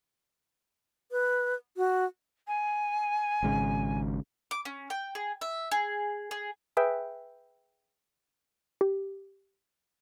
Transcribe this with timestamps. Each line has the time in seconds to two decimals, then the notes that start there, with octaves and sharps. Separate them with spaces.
1.12 B4
1.77 F#4
2.47 G#5
3.43 G#1 G#2 C#3
4.51 D6
4.65 C#4
4.90 G5
5.15 G#4
5.41 E5
5.71 G#4
6.31 G#4
6.77 G#4 B4 E5 G5
8.81 G4